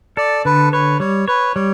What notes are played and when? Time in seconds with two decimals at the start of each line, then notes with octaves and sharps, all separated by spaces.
0.17 A4 D5
0.45 D3 B4
0.73 B4 C#5
1.00 G3 C#5
1.28 B4 C#5
1.55 G3 C#5